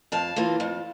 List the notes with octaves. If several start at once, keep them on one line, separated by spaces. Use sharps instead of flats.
F2 F5 A5
E3 A#3 F4
F2